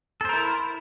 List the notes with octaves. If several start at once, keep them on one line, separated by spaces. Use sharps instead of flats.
E4 A4 A#4 C5